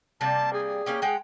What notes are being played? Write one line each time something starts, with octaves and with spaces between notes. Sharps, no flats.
C3 G3 A#3 A5
G#4
A#3 C#4 G4
G#3 F#5 G5